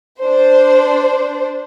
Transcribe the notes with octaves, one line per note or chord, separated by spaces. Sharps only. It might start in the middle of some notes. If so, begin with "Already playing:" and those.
D4 C5